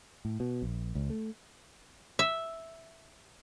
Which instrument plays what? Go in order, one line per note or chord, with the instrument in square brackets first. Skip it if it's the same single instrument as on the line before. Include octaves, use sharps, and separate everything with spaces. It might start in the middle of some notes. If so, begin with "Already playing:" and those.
[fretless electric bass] A2
B2
A#1
C#2
A3
[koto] E5